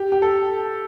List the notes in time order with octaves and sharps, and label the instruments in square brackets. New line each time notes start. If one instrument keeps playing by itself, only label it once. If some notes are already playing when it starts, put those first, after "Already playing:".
Already playing: [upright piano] G4
G4
A4